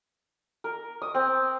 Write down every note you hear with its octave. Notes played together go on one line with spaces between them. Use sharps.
A#4
D#6
C4